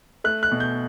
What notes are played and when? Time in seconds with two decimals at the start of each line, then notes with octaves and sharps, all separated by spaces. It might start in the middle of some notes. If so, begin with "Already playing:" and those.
0.24 A3 F#6
0.43 F#6
0.52 B2
0.60 G6